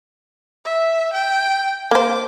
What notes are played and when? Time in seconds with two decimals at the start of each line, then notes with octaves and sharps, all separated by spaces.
0.65 E5
1.13 G5
1.91 A#3 C5 D6